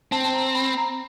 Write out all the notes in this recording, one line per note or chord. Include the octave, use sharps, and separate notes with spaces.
C4 A5
A5
A#5
B5
A#5